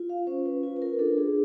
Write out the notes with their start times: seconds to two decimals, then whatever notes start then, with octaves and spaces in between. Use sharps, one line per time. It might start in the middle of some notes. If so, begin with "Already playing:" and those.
Already playing: F4
0.09 F5
0.27 C#4 C5
0.46 B4
0.63 F4 B4
0.76 B4
0.82 A#4
0.99 D4 A4
1.18 G#4